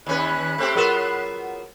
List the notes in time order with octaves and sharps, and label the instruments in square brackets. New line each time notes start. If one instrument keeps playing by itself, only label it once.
[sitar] D#2 C#4 B4 [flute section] B5 F#6
[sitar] A3 C4 G4
[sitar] F#3 B3 F4 [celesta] G#4 A#4 E7